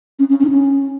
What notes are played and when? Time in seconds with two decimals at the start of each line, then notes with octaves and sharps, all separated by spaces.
0.19 C#4
0.30 C#4
0.40 C#4
0.45 D#4
0.50 C#4